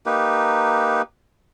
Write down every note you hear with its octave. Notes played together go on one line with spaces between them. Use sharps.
A#3 D#4 G4 B4